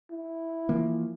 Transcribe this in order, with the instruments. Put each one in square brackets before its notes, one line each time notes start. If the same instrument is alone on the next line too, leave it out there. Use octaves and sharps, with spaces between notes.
[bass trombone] E4
[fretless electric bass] E3 F3 A#3